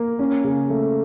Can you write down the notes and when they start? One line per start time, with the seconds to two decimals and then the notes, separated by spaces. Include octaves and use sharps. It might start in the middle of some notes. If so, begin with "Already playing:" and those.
Already playing: A#3
0.19 C#4
0.44 C#3
0.70 A3